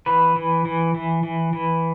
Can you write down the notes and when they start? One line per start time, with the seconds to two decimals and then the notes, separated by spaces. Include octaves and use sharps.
0.06 E3 B4
0.36 E3
0.65 E3
0.94 E3
1.23 E3
1.53 E3